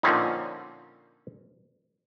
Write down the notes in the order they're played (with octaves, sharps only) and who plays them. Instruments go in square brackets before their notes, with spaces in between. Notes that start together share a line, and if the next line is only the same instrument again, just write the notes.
[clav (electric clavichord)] A#2 D3 F3 C4 C#4 D#4